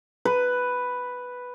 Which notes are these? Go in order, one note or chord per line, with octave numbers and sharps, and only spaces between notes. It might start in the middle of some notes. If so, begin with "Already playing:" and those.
B4